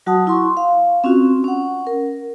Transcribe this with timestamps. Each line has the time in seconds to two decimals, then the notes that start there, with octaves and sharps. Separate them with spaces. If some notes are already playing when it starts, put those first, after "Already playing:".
0.06 F#3 F#4 F#5 A5 D#6
0.27 E4 C6 C#6
0.57 F5
1.04 C4 C#4 F4 F#4
1.44 C#4 F#5
1.87 A#4